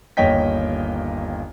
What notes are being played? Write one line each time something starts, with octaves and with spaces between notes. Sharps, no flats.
G1 D#2 C#5 D#5 G5 B6